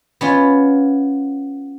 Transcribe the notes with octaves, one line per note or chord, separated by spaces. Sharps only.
B3 C#4 F4